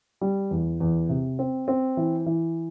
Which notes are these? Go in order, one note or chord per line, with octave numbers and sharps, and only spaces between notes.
G3
E2
E2
C3
C4
C4
E3
E3